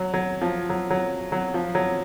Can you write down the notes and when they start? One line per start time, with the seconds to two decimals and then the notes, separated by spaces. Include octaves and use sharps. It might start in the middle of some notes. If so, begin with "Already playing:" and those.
Already playing: F#3
0.14 F#3
0.42 F3
0.70 F#3
0.90 F#3
1.32 F#3
1.54 F3
1.75 F#3